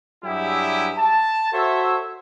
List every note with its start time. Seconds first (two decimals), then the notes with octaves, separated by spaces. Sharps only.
0.24 G2 F#3 E4 G4 G#4 E5
0.96 A5
1.52 F#4 A4 C5 C#5 E5